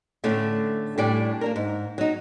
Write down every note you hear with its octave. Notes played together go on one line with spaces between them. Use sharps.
A2 D3 A3 C#4 D4
A2 G3 D4 D5 G#5
A#3 D4 A#4
G#2
F#3 D#4